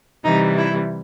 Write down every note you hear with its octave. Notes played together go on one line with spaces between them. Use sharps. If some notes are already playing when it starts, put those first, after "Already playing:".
C3 E3 G3 D#4
E4